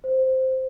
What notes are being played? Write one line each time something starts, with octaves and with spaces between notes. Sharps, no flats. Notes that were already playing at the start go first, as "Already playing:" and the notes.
C5